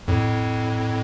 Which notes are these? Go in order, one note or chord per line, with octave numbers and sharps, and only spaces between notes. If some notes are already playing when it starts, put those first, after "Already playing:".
F2 A2